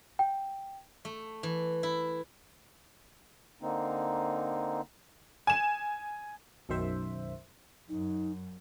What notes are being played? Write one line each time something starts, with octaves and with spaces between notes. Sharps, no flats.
G5
A3
E3
E4
D3 A#3 C4 D#4
G#5 E7
B1 F#2 D#3 C5 E5
F#2 D#4